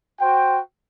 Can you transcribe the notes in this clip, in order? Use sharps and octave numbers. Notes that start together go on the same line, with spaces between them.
F#4 C5 G5